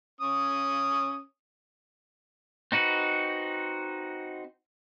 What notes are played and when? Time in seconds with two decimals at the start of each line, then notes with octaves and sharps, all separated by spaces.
0.21 C#4 D#6
2.72 C4 D#4 F#4 B4